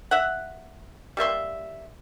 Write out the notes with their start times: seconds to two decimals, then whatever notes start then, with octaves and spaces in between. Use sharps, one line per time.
0.11 E5 F#5
1.17 G3 A#3 E5 C6